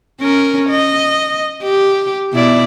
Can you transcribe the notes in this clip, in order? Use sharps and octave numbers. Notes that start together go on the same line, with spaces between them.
C#4 A#4
D#5
G4
B2 E4 D5